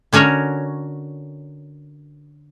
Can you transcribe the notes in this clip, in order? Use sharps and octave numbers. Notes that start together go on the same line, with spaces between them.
D3 C#4 F#4 A#4 C#5